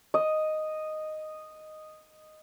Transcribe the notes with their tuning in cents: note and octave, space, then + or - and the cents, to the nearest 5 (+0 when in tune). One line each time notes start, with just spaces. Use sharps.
D#5 -5